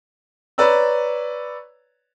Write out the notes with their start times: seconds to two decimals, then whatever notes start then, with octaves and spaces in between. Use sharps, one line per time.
0.58 B4 C#5 D5 A#5 E6